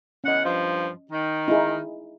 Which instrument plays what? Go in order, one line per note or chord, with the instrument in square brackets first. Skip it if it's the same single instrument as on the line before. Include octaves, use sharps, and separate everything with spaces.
[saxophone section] E2 F#5 [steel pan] C#4 D#5
[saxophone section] G2 F3
D#3
[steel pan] D#4 E4 G#4